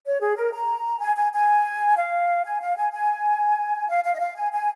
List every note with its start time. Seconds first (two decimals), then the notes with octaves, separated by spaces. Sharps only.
0.04 C#5
0.21 G#4
0.36 A#4
0.52 A#5
1.01 G#5
1.16 G#5
1.33 G#5
1.96 F5
2.44 G#5
2.60 F5
2.77 G#5
2.93 G#5
3.89 F5
4.04 F5
4.15 D#5
4.20 F5
4.36 G#5
4.52 G#5